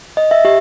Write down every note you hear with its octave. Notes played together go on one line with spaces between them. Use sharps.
D#5
E5
G4 E5